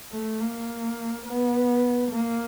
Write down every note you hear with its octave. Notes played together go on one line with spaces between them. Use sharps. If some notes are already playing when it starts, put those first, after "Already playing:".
A3
A#3
B3
A#3